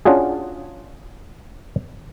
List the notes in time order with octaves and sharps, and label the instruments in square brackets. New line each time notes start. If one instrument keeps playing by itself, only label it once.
[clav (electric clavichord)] C#4 D4 F4 F#4 G#4